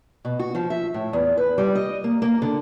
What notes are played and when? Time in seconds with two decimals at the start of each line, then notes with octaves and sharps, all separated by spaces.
0.25 B2
0.39 F#4
0.55 F3
0.70 E5
0.94 A2
1.13 E2
1.37 B4
1.58 G3
1.75 D#5
2.04 A#3
2.22 A#3
2.42 D3